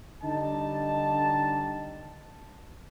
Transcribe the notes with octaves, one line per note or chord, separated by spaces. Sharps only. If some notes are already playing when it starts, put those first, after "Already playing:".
D3 G3 D#4 A5